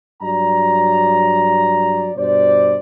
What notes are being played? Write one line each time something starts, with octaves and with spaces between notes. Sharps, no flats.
G2 F#3 D5 A#5
G2 B2 C5 D5